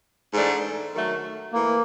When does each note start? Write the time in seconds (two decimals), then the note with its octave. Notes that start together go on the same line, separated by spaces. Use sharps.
0.33 G#2 E3 A3 D4
0.92 D#3 F#3 A3
1.53 E3 A3 A#3